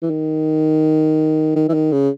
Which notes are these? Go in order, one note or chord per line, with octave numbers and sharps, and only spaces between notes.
E3
D#3
D#3
E3
D#3
C#3